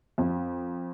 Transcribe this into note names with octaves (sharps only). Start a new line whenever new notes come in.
F2